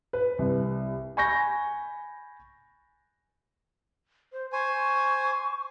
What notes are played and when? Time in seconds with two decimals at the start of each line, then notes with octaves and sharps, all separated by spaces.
0.13 B4
0.39 C2
1.17 G#5 B5 C#6 G6 A#6
4.33 C5
4.53 C5 G#5 C#6